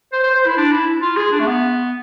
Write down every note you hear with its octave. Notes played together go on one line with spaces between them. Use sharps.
C5
C5
C5
E4
D4
E4
F4
G#4
D4
A3
B3